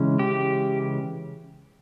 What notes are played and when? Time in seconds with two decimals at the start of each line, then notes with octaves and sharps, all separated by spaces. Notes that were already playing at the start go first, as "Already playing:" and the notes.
Already playing: C#3 E3 G#3 C#4
0.19 G4